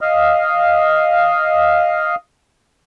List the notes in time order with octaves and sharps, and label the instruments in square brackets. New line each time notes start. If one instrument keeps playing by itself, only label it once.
[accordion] D#5 F5